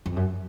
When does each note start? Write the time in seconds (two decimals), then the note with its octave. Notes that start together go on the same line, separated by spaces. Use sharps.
0.06 F2
0.16 F#2